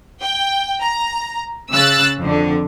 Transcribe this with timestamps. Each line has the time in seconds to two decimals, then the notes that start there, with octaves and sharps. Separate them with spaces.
0.20 G5
0.81 A#5
1.72 C#3 E6 F#6 A6
2.21 F2 D3